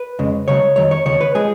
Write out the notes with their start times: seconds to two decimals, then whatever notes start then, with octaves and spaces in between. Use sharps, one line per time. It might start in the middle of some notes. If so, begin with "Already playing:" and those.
Already playing: B4
0.19 F2 C#3 G#3
0.48 C#2 C#3 F#3 C#5
0.76 F2 D#3 F#3 C#5
0.91 C#5
1.05 D#2 C#3 F3 C#5
1.21 B4
1.35 F3 G#3 G#4